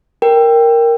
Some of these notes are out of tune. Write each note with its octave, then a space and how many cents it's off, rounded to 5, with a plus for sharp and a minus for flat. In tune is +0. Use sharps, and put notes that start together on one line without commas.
A#4 +0 G5 +5